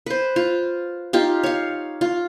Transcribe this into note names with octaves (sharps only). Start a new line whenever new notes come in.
B4 C5
F4
D#4 F4 G4
C#5 F5
F4